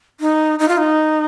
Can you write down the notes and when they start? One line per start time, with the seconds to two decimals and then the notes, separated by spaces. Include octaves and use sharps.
0.20 D#4
0.59 D#4
0.68 F4
0.77 D#4